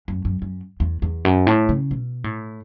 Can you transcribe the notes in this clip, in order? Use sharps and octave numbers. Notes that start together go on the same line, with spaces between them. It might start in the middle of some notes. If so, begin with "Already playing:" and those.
F#2
F#2
F#2
E2
E2
F#2
A2
C#3
B2
A2